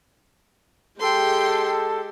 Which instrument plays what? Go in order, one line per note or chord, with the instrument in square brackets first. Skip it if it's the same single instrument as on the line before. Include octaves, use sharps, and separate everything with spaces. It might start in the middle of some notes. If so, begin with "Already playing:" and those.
[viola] G#3 G4 [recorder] A4 [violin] G5 C6